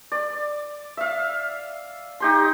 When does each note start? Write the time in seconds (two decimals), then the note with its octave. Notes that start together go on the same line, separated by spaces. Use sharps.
0.12 D5
0.97 E5 F5
2.20 D#4 G4 C6